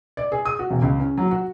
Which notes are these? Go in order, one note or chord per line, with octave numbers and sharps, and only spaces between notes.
D5
G#4
D#6
F#4
E1
C#2
C#4
F#3
F#4